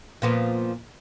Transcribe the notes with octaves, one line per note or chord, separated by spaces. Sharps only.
A#2 F3 B3